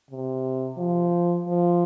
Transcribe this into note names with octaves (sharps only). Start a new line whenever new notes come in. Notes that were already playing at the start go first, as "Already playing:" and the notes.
C3
F3
F3